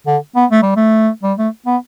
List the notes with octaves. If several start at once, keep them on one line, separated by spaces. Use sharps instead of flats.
D3
B3
A3
G3
A3
G3
A3
B3